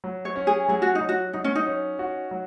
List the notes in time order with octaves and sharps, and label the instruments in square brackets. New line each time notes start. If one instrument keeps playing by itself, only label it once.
[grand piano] F#3
[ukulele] C#5
[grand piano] C#4
[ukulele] G#4
[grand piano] F#3 [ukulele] G#4
[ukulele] F#4
D#4
[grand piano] F#3
[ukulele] F#4
[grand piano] F#3 [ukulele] D#4
[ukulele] C#4
D#4
[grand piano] C#4
F#4
F#3